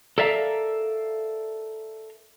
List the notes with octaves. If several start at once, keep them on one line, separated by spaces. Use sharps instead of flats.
A4 A#4 D5 E5 F5 A#5